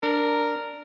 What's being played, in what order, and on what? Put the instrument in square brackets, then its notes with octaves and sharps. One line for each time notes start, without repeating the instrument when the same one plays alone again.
[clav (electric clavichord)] D4 [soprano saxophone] A#4